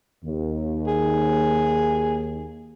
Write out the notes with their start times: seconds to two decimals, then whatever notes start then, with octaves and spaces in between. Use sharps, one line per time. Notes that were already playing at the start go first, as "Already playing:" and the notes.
0.25 D#2
0.87 G#4